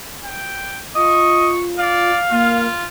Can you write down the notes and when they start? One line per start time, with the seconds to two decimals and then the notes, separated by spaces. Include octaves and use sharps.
0.24 G5
0.95 F4 D#5 C#6
1.79 D5 F5
2.31 A#3 F4